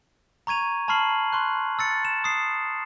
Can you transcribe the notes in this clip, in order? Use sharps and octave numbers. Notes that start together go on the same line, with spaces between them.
A#5 C#6 G#6 D#7 F7
A5 B5 C#6 F6 C7 F#7
C6 C#6 F#6
E6 A6 C#7
E7
D#6 C7